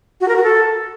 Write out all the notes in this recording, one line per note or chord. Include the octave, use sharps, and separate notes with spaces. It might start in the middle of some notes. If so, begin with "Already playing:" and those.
F#4
A#4
F#4
A4